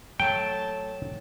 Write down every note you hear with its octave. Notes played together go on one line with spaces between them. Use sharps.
F#3 A3 G5 A5